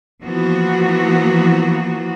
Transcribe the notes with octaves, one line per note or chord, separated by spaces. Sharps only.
E3 F3 A#3 B3 F#4